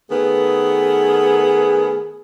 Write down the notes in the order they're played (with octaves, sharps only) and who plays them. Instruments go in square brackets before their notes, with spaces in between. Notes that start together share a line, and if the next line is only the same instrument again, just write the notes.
[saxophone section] D#3 A3 B3 [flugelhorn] G#4